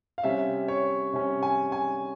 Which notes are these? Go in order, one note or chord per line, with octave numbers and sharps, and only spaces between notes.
F5
C3 G3 C#4 E5
C#5
C3 G3 C#4
G#5
G#5